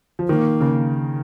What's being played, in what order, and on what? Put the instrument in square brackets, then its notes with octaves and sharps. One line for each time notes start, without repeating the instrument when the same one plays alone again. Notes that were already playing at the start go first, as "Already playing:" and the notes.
[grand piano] F3
[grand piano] D#3 [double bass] A#3
[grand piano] C#3